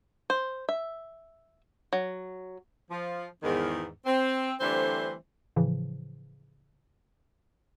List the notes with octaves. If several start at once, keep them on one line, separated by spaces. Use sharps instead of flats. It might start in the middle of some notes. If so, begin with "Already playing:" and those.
C5
E5
F#3
F3
E2 G#2 D#3
C4
D3 E3 G3 A3 C4 C5
A2 C#3 E3 F3